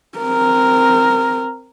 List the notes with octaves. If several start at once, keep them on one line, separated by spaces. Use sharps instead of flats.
C4 A#4